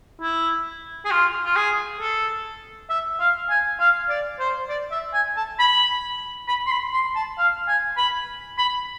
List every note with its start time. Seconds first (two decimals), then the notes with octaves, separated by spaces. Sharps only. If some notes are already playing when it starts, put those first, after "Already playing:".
0.21 E4
1.05 G#4
1.11 F4
1.45 F4
1.56 G#4
2.00 A4
2.90 E5
3.20 F5
3.50 G#5
3.80 F5
4.09 D5
4.39 C5
4.69 D5
4.91 E5
5.14 G#5
5.36 A5
5.59 B5
6.48 B5
6.66 C6
6.71 B5
6.93 C6
7.15 A5
7.38 F5
7.68 G#5
7.97 B5
8.58 B5